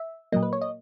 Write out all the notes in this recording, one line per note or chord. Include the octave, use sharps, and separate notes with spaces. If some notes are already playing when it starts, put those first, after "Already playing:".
Already playing: E5
A#2 F#3 A#3 D#5
B4
C#5
D#5